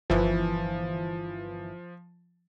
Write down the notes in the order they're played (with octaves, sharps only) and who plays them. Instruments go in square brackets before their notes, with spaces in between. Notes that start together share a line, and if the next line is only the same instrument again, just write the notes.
[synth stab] G1 E3 [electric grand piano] F3